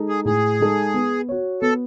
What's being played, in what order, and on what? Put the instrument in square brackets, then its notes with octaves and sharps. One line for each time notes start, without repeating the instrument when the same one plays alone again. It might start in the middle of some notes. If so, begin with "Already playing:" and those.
Already playing: [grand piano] G#3 D#4 A4
[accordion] G#4
[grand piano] A2 [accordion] G#4
[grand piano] G#3 D#4 A4
B3
F#4 C#5
[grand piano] B3 [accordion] A4